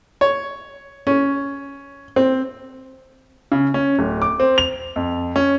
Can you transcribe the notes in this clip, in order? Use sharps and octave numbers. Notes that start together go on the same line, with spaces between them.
C#5
C#4
C4
C#3
C#4
D1
D6
C4
F7
F2
C#4